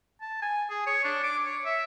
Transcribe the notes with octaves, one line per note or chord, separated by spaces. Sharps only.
A5
G#5
G#4
C#5
D4
D6
C#5
E5